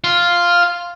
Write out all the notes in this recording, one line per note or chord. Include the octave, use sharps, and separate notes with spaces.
F4